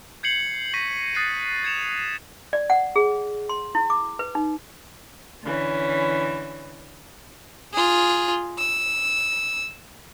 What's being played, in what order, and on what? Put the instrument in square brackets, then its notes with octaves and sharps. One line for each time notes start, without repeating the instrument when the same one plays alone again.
[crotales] G6 G#6 C7 C#7 F#7
C#6 A#6 B6 D#7 F#7
D#6 F#6 A6 C7 C#7 D#7
G#6 C#7 E7 F7
[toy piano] D5
F#5
G#4
C6
E4
D6
B4
D#4
[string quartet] D3 E3 C#4
[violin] F4 G#4
E6